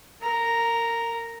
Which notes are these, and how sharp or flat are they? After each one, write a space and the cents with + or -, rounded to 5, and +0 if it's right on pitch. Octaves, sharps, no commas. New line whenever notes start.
A#4 -25 A#5 +0